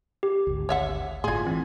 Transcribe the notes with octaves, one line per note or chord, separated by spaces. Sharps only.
G4
G#1 D2
C#5 E5 F#5
G1 A2 F4 G#4 C6 G#6
E3 C4